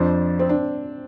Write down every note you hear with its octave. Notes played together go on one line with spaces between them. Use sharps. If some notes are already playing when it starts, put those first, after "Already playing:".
Already playing: F2 F3 D4 C5
C4
D4